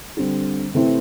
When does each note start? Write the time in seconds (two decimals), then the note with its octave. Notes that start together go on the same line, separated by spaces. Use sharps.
0.17 D3 G3 C4
0.74 C3 E3 A3 C4 E4